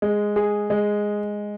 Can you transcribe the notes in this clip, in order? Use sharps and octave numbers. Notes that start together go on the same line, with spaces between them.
G#3
G#4
G#3